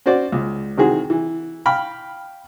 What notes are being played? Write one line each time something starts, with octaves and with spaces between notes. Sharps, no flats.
C#4 F#4 C5 D5
C#2
C3 D#3 E3 F#4 G#4
E3
F5 G5 B5 F6